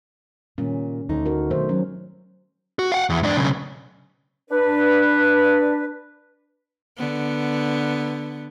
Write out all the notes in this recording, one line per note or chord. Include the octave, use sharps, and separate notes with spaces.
A#2 D#3 G3 C#4
D2 D#4
F#4 A#4
B2 D#3 F#3 A3 C5
F#3 C#4
F#4
F5 F#5
E2
G#2 D4
B1 C#3
D4 B4
D3 B3